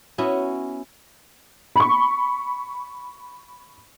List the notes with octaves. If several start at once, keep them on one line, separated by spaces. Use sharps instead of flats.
B3 C#4 E4 F#4
B5 C#6